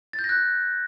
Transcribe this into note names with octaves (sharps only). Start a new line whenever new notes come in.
A6
G6
A#6
F#6